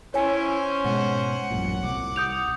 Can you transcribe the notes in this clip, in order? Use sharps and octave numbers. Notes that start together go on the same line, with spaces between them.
C#4 E4 C5 C#5 G#5
G#2 B2 G#3 F#5
A1 F#2 A#2
C2 D6
D#6 G6 F7